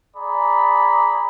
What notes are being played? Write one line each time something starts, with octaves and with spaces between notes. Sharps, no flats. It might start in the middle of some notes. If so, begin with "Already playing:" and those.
G#4 D5 A#5 B5